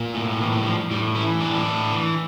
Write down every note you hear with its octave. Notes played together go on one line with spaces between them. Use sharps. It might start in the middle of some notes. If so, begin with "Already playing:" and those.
Already playing: A#2
A2
E3
F3
G3
E3
F3
A2 G3
E3 E4
A2 D4
A2
E3